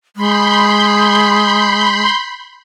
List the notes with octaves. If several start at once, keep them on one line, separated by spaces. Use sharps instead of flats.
G#3 B5 C6 G6